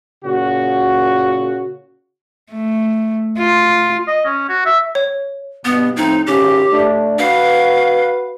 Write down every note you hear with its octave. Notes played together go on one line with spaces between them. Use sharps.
A#2 C#3 F#4
A3
F4
D#5
C#4
F#4
E5
C#5
G2 B2 B3
A2 F3 C4 D#4
G#1 C#3 C#4 G4
A2 A3 D4
F#4 B4 F5